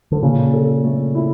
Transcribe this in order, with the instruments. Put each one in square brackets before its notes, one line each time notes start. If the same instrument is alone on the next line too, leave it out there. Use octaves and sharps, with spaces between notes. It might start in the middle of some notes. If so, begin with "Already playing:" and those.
[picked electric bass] D3
[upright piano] A#2 [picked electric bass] C#3
[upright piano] A4
A3
E4